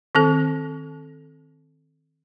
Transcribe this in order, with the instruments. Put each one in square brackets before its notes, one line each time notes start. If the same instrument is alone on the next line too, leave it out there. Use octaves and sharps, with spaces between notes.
[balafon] D#3 C4 A4